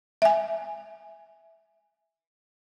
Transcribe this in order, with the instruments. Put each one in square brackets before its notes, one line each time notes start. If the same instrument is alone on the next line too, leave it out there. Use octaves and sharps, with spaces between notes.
[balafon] E5 G#5